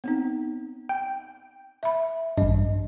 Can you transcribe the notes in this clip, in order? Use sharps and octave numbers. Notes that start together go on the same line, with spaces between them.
B3 C4 D#4
G5
E5 B5
A1 G2 D#5